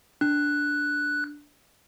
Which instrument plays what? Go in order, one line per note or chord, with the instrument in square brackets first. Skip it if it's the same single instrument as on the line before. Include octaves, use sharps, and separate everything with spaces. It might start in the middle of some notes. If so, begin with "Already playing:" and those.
[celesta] D4 [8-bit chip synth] F#6